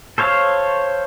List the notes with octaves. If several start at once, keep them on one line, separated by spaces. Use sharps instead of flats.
A4 C5 C#5 F5